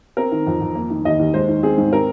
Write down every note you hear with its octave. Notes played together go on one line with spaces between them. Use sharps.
C4 A#4
D#3
F2
F2
A#3
D#3
D#2 D#5
D#2
G#3 C5
D#3
C4 G#4
G#2
C4 A#4